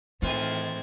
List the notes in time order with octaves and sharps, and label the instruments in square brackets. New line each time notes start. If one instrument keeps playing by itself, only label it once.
[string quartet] A2 G#6 [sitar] D#3 G#3 F4 [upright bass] E3 [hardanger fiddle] C4